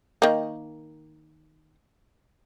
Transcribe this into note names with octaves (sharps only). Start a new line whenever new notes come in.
D#3 A#3